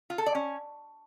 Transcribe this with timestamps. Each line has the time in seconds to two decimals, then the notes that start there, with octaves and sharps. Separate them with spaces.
0.10 F4
0.18 A4
0.26 D5
0.35 C#4